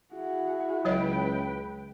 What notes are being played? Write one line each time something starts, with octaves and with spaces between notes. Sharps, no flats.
E4 F#4 G#4
C#2 F#3 B4 C#5 D#5 G5